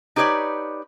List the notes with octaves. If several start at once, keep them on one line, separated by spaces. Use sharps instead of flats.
D#4 G4 B4 C#5 D5